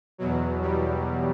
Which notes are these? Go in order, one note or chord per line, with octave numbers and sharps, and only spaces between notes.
E2 B2 F#3
G3